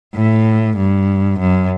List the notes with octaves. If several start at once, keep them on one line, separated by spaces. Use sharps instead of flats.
A2
G2
F#2